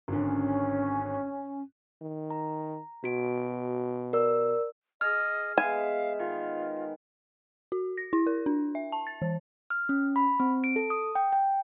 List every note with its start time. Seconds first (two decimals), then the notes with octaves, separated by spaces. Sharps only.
0.08 G#1 D3 C#4
2.02 D#3
2.30 A#5
3.04 B2 F#4 D7
4.13 A#4 D5 E6
5.01 G#4 D#5 F6
5.58 G#3 B3 E5 F5 G#5
6.19 D#3 F4
7.72 F#4
7.97 A#6
8.13 E4
8.27 A#4
8.46 D4
8.75 E5
8.92 A5
9.07 A6
9.22 E3
9.70 F6
9.89 C#4
10.16 B5
10.40 C4
10.64 D7
10.76 A4
10.90 D#6
11.15 G5
11.32 G5